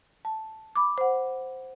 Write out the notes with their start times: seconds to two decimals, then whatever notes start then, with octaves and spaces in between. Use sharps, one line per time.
0.25 A5
0.76 B5 D6
0.98 C5 F#5